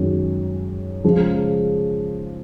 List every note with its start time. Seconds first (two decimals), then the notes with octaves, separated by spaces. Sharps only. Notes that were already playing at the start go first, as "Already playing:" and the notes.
Already playing: F#2 D#3 G#3 C#4
1.04 C#3 F3 G#3